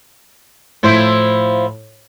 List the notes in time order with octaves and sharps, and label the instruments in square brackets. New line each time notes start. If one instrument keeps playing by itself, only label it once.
[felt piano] A2 [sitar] F3 E4 C5